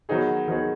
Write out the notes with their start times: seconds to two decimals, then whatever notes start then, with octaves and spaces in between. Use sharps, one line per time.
0.09 D#3 F#3 B3 D#4 G#4
0.48 D#3 F#3 B3 D#4 G#4